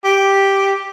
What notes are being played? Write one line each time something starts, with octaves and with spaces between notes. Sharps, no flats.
G4